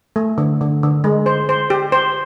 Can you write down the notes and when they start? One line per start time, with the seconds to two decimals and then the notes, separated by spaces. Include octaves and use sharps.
0.16 A3
0.38 D3
0.61 D3
0.83 D3
1.04 G#3
1.26 C5
1.49 C5
1.70 G4
1.92 C5